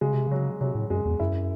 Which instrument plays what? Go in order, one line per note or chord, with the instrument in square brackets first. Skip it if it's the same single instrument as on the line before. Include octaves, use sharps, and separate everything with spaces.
[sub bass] C#3 [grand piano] G#3
[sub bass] C3
[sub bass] C#3 [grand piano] F#3
[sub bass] C3 [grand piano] F#3
[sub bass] A2
[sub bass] F#2 [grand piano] G#3
[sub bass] E2
[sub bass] F#2 [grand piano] E4